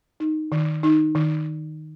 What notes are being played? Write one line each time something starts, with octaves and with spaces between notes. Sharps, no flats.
D#4
D#3
D#4
D#3